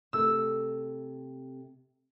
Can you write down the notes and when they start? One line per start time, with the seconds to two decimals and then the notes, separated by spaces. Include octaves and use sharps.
0.13 C3 A3 A4 E6